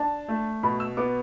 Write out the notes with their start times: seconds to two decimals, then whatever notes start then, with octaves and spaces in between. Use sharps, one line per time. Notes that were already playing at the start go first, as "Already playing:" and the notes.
Already playing: D4 A5
0.29 A3
0.63 B2 B5
0.80 E6
0.97 B3 D6